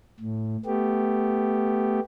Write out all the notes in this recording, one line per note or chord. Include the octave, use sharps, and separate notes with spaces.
A2
A3 B3 G4